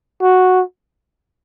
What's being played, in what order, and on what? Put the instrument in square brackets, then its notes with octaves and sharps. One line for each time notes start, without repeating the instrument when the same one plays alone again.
[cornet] F#4